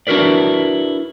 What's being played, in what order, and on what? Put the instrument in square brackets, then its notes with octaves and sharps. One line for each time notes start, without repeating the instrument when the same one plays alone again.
[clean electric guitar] D4 E4 F#4 A#4 B4 D5